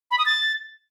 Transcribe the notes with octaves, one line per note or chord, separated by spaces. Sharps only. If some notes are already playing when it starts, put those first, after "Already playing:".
B5
D#6
A6